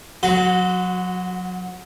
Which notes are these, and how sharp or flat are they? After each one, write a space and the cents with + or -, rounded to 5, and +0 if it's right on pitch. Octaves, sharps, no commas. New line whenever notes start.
F#3 -25 F#4 +0 C6 -30